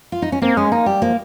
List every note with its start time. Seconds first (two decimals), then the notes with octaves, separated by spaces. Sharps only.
0.12 F4
0.22 D#4
0.32 C#4
0.42 A#3 C4
0.57 G#3 C#4
0.72 A#3 D#4
0.86 G3 G4
1.02 F3 A#3